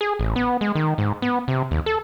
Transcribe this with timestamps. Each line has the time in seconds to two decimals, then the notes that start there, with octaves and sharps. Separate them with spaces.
0.01 G#4
0.19 A1
0.36 B3
0.61 G#3
0.75 D#3
0.98 G#2
1.22 B3
1.48 C3
1.71 D#2
1.86 A4